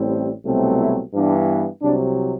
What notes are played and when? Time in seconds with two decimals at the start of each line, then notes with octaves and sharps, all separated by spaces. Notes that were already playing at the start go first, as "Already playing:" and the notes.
Already playing: A1 A2 G3 C4
0.46 C2 B2 F#3 A3 C4
0.80 E4
1.14 G2 E3 B3 D4
1.82 C2 C3 F#3 D4